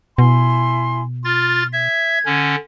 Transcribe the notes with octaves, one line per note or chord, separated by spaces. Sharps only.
B2 E4 G#5 C6
F4 F6 A6
E5 G#6
D3 C#4